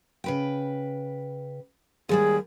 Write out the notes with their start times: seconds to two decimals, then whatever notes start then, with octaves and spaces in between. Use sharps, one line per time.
0.24 C#3 B4 G5
2.09 D#2 G3 G#3 G#4